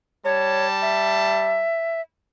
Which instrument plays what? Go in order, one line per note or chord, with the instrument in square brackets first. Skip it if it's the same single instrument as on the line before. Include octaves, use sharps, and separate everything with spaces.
[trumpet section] G3 A5 [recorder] C#5
[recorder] E5